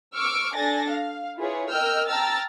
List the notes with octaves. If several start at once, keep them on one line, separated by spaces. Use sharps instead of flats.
C#6 D6 E6 F6 D7
D4 A4 G#5 A6 A#6
F5
E4 F4 G#4 B4 C#5
A#4 D#5 G5 E6 F6 G6
G5 A5 A#5 E6 F6 A6